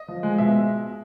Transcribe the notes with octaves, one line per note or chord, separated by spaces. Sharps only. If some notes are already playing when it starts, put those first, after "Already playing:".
Already playing: D#5
F3
G#3
B2 E5